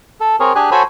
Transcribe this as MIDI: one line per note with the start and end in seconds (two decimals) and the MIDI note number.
0.20 0.36 69
0.40 0.53 60
0.40 0.53 68
0.40 0.53 70
0.40 0.53 73
0.55 0.70 62
0.55 0.70 67
0.55 0.70 68
0.55 0.70 80
0.55 0.70 90
0.71 0.83 66
0.71 0.83 69
0.71 0.83 72
0.71 0.83 73
0.71 0.83 80
0.71 0.83 83